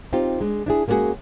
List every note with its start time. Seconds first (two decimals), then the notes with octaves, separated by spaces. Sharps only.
0.13 C4 D#4 F4 G4
0.41 G#3 D4
0.66 D4 E4 G#4
0.88 G#3 A#3 C#4 D4 F#4 G#4